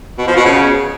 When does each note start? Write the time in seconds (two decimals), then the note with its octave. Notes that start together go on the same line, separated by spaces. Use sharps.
0.18 B2
0.27 F3
0.36 B2
0.45 C#3